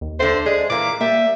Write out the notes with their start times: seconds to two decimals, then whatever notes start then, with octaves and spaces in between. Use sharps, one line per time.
0.01 D#2
0.20 D3 A3 C5
0.46 G#3 D4 G#4
0.70 A#2 E3 A#3 D6
1.01 G3 A#3 E5